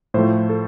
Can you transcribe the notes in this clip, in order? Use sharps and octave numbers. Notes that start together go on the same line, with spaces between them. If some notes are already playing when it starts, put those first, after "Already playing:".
A2 F3 A3 C5
A4